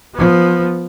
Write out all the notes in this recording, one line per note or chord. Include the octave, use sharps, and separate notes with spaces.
F3 B3